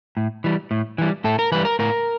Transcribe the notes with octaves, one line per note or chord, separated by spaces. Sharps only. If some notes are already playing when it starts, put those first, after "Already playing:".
A2
E3 G3
A2
E3 G3
A2 A4
A#4
E3 G3 B4
A#4
A2 A#4